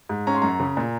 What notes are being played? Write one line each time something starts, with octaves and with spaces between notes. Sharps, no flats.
G#2
C#4 A#5
C6
F#2 A#5
C#3
A#2